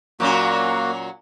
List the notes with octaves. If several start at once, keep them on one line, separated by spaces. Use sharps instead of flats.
A#2 F#3 A#3 C#4 F#4